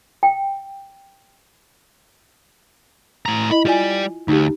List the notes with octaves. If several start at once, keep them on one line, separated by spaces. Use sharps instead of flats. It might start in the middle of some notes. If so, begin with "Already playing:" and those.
G5
A2 A#5
E4 D#5 B5
G3 F4 D5 G#5
D2 D#4 G4